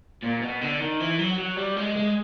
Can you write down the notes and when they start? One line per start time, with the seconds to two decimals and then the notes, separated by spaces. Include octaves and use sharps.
0.22 A#2
0.41 B2
0.61 D3
0.80 D#3
1.00 E3
1.19 F#3
1.38 F#3
1.57 G3
1.77 G#3
1.96 G#3